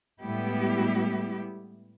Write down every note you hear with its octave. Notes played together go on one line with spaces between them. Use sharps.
A2 G3 G#3 B3 E4 G4